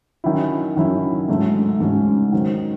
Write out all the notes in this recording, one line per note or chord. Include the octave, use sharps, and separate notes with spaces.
D#3 F#3 C#4 E4
D#3 F#3 C#4 E4
G#2 F#3 A3 C#4
G#2 F#3 A3 C#4
D#3 F#3 C4